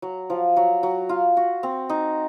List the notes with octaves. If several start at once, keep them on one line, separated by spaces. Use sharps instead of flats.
F#3
F3
F#3
F#3
F4
F#4
C4
D#4